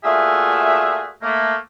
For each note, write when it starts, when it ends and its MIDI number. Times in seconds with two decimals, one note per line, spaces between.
0.04 1.09 46
0.04 1.09 57
0.04 1.09 65
0.04 1.09 66
0.04 1.09 68
0.04 1.09 76
1.22 1.54 57
1.22 1.54 58